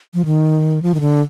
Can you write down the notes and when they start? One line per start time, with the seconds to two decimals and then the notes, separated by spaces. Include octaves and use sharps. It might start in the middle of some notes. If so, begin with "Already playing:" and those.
0.14 F3
0.25 D#3
0.82 F3
0.94 D#3
1.00 D3